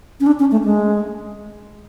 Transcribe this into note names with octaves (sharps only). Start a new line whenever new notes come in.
C#4
D4
C#4
A3
G#3